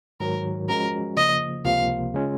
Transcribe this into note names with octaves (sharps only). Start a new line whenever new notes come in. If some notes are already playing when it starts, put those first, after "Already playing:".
G#2 D#3 F#3 A#4
F3 G#3 C#4 F#4 A#4
C#3 F3 A#3 D#5
C#2 C3 F3 A#3 F4 F5
C#3 G#3 C#4 F4